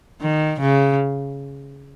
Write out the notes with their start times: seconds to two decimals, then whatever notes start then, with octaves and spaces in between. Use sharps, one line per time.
0.21 D#3
0.60 C#3